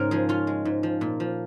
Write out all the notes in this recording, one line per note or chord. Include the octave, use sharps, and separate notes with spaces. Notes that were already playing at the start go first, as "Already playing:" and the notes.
Already playing: G#2 C#3 C#4 A#4
F3 G#4
C#4 F4
G#3
G#2
F3
A#2
F3